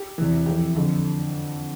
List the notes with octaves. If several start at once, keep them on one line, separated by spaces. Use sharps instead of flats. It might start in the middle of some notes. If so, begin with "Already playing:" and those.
Already playing: G4
E2 C3 E3
F2 E3 G4
F2 D3